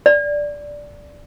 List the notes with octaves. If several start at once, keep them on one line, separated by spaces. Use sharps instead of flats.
D5